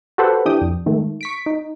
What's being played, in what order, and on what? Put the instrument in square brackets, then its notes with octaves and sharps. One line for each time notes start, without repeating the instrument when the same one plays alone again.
[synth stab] F#4 G4 A4 B4 C5 F#5
E3 D4 G4 G5 D#6
F2
G#2 D#3 A3
C#6 B6 D7
D#4